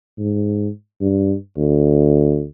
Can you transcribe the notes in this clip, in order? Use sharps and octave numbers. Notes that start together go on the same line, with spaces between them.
G#2
G2
D2